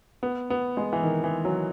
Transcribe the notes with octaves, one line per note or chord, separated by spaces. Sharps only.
B3
B3
G#3
E3
D#3
E3
F#3